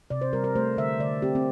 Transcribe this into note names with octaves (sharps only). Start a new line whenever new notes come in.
C3 D5
C5
G3 A#4
A#4
A3 C5
D3 E5
D3 D5
C4 G4
C4